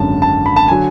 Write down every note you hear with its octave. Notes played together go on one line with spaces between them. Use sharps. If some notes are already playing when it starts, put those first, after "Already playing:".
Already playing: G#1 F#2 D3 A5
A5
B5
A5
D3 F#3 G#5